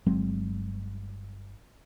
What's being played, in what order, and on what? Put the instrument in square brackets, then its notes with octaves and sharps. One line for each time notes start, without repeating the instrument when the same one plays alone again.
[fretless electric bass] G1 F#3 G#3 C4